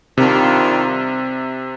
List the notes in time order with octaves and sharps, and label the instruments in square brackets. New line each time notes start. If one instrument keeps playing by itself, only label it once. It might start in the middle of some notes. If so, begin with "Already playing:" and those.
[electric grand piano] C3 [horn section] D#3 G3 D4 F4